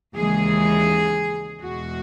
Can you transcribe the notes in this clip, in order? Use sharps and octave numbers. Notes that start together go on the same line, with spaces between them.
D#2 C#3 E3 G#3 G#4
E2 B2 G#3 F#4